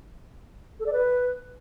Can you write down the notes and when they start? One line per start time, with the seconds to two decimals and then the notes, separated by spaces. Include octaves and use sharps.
0.80 A4
0.86 D5
0.93 B4